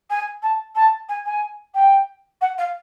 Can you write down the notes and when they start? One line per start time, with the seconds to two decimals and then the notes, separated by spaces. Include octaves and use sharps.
0.10 G#5
0.42 A5
0.75 A5
1.09 G#5
1.25 G#5
1.74 G5
2.41 F#5
2.58 F5